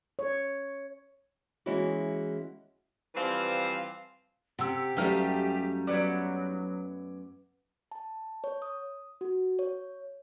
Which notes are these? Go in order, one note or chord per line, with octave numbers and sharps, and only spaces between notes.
C#5
E3 G#3 A#3 C#4 E4 F#4
E3 F3 G3 C4 B4 F5
C3 G4 F#5 E6
F#2 G3 A3 D#4 B4 F5 F6 G6
F#3 B3 E4 B4 D5 F#5
A5
C#5
D#6
F#4
C#5